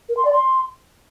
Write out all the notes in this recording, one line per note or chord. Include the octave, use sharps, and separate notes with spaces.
A#4
C6
D5
C6